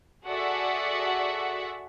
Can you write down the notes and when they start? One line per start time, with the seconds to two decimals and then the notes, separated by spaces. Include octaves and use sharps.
0.25 F#4 G#4 A4 D5 E5 F#5